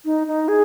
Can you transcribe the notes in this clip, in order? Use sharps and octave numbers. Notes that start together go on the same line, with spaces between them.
D#4
D#4
G#4